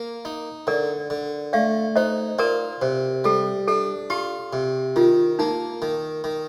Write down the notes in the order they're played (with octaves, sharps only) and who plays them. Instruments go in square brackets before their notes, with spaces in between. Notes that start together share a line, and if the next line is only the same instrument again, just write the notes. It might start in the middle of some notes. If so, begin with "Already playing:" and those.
Already playing: [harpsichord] A#3
D#4
[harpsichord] D3 [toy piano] A#4 D5
[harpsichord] D3
[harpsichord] A3 [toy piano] D5 F5
[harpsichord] D#4 [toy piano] C5 D#5
[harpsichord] F4 [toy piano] A#4 D5
[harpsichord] C3 [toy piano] C5
[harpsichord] G3 [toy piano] A4
[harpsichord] D4 [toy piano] A4
[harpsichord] F4 [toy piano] G4
[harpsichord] C3
[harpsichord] D#3 [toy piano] F4
[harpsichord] A#3 [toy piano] D#4
[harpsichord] D#3
D#3